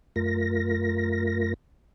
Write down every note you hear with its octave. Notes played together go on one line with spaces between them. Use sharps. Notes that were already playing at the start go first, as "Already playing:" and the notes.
F#2 A3 F4 A#4 A#6